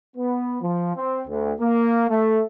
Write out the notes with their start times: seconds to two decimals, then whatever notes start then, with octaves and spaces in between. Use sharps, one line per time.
0.17 B3
0.61 F3
0.95 C4
1.28 D2
1.61 A#3
2.09 A3